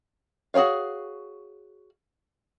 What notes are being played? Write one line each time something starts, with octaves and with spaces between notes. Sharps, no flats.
F#4 G#4 B4 C#5 F5